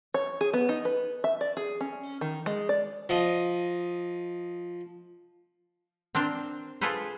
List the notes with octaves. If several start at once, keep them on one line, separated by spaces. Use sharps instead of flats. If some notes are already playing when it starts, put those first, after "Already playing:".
C#5
G#4
B3
D#4
B4
E5
D5
G#4
C#4
D#3
G#3
D5
F3 D#5
C4 D4 A#4 C5
F4 G#4 A4 B4 C5